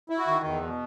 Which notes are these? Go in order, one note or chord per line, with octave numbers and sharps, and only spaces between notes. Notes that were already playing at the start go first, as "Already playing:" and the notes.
E4
F#4
D#3
E2
B2